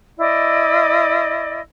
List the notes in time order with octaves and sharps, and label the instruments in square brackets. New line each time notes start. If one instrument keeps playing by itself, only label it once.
[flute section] E4 D5 D#5